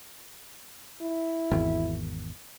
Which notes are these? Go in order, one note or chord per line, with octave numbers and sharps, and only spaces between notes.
E4
G#1 E2